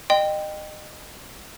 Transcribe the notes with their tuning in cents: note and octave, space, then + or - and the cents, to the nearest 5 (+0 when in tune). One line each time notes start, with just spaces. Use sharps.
D#5 -30 G5 +5 C6 -20